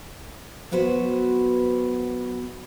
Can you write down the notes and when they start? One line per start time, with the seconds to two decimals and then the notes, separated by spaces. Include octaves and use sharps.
0.71 F#3 B3 F#4 B4 C5